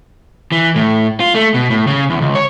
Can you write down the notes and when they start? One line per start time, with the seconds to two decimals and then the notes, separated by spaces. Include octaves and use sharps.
0.52 E3
0.75 A2
1.20 F4
1.35 A3
1.54 B2
1.70 A2
1.87 C#3
2.10 E2
2.21 C#2
2.35 C#5